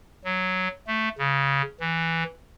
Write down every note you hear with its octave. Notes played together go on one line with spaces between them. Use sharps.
F#3
A3
C#3
E3